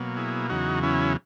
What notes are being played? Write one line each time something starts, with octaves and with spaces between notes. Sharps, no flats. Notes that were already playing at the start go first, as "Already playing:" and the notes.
Already playing: B2 F#3 A#3
E4 G#4
E2 C#3 F#3 D#4 F#4
C#4 E4